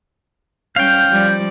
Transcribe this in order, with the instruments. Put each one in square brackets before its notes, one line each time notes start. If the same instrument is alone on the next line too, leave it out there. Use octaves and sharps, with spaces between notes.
[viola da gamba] G3 C#4 [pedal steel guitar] F5 G5 [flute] G6
[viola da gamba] F3 G3 D5